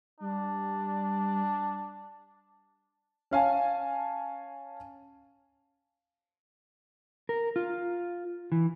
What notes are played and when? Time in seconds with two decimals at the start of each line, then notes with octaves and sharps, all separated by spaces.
0.20 G3 D4
3.31 C#4 F5 G#5 A5
7.29 A#4
7.56 F4
8.52 E3